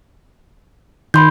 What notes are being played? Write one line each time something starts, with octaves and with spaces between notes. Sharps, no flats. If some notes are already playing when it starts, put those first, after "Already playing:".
D#3 B5 C6 G6